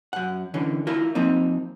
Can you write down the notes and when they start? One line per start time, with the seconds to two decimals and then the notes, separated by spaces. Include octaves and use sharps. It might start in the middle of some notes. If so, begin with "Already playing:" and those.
0.13 F#2 F#5
0.54 D3 E3 C#4
0.87 E4 F4 A#4
1.15 F3 A#3 C4 D#4